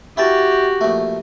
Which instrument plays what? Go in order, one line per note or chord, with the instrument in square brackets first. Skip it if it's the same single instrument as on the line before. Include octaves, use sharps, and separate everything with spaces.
[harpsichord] E4 G5 A5 [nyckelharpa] F#4 G4
[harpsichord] A#1 A3